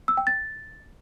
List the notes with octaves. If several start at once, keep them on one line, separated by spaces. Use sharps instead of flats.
E6
G5
A6